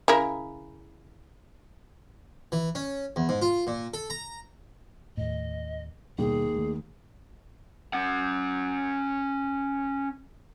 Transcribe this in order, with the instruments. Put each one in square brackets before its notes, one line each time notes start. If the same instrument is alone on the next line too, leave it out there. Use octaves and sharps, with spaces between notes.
[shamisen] C#3 E4 A#4
[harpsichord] E3
C#4
E2
G#2
F4
A#2
A4
A#5
[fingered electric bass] D#2 A2 [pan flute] D#5
[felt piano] D#2 [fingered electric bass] B2 G3 [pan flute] G#4
[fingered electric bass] D#3 A3
[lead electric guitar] C#4 F#5